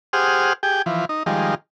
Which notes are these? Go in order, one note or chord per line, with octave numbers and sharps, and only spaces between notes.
G4 G#4 C5 F#5 D#6 F6
G4 G#4 G5
E3 F3
D#4
D#3 F3 G3 G#3